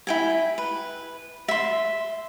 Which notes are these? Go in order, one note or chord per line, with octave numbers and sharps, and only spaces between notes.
E4 G5 G#5
B4
E5 C6